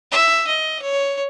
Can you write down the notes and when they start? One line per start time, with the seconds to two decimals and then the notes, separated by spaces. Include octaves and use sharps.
0.11 E5
0.47 D#5
0.82 C#5